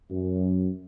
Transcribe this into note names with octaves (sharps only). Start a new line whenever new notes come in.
F#2